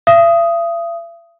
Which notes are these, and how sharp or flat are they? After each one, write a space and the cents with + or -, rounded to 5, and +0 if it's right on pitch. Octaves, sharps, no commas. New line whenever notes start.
E5 +45 D#6 +5